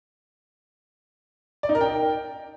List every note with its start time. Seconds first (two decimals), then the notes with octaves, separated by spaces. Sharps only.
1.63 D5
1.69 D#4
1.75 A#4
1.81 G5